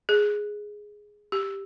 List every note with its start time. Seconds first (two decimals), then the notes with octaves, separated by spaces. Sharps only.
0.09 G#4
1.32 G4